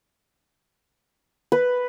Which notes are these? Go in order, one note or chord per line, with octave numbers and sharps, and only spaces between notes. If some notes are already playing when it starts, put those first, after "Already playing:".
B4